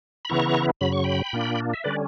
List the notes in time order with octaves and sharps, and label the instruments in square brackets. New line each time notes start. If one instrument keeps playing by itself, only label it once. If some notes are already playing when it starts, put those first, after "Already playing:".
[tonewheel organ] B5
C#3 E3 B3 E4 A#5 C#6
F#2 C#3 F#3 B5
C#6
G5 B5
A#2 A#3 D4
E5
D3 G3 C#4 B4 D5